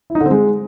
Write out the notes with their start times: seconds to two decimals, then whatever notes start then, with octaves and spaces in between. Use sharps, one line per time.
0.10 E4
0.15 D#4
0.20 D3
0.26 C4
0.31 G#3